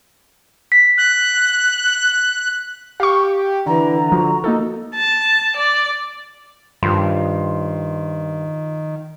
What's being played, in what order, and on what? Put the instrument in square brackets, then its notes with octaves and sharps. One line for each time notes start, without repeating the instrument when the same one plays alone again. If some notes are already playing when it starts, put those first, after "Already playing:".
[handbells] B6
[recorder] F#6
[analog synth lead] G4 [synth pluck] F5 C#6
[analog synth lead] D3 [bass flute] E3 [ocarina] A#5
[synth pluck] F3 [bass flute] F#4
[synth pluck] A#3 D#4 A4
[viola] A5
D5
[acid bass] G2 [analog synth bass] D#3 [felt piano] F3 C6